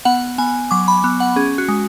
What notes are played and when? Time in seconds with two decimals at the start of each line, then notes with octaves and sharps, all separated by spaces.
0.05 B3 F#5
0.38 B3 G#5
0.71 F#3 D6
0.88 B5
1.04 B3
1.20 F#5
1.36 C#4 G#4
1.58 F#4
1.68 G#3